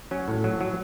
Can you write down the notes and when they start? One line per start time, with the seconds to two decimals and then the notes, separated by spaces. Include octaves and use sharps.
0.11 F#3 C#4
0.28 A2
0.44 F#3
0.61 F#3